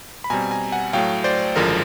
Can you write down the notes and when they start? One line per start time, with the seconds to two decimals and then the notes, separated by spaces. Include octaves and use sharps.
0.24 B5
0.30 B2 G3 C4 G#5 A#5
0.51 G#5 A#5
0.72 F#5 G#5
0.93 A2 F#3 A3 F5 G5
1.24 C5 D5
1.56 G#1 F#2 D3 F3 G#3 A#4